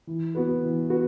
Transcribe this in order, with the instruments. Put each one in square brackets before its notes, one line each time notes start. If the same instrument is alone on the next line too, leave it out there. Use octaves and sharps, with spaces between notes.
[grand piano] E3
B3 F#4 B4
E3
B3 F#4 B4